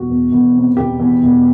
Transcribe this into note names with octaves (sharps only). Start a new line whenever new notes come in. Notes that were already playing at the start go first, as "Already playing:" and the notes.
Already playing: E1 F#4
E2
E1
C3
E1 G4
E2
E1